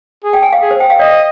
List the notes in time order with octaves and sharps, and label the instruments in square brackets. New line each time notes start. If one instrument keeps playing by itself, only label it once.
[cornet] G#4
[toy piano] G5
G#5
F5
[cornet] G#4
[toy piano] C5
G5
F5
[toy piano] D5 [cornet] D#5